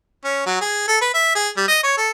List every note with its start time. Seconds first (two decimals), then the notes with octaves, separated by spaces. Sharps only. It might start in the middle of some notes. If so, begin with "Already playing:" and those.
0.25 C#4
0.46 F#3
0.61 G#4
0.88 A4
1.01 B4
1.14 E5
1.35 G#4
1.57 G3
1.68 D#5
1.83 C#5
1.97 A4